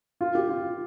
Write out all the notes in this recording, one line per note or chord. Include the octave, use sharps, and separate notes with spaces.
F4
G4
F4